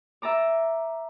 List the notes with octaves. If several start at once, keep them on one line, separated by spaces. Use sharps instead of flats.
E5 A5 A#5 D6